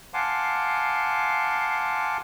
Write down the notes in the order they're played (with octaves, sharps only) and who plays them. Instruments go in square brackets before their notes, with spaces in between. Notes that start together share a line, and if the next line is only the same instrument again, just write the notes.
[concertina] F5 F#5 G#5 A5 C6 D6